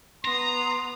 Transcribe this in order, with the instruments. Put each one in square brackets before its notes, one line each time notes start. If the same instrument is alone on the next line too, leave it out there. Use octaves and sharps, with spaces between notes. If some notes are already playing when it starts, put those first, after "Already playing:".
[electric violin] B3 D#6 [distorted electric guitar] A#5 [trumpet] C6